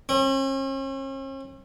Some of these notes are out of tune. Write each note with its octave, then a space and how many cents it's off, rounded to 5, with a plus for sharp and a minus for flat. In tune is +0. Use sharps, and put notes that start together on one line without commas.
C#4 -45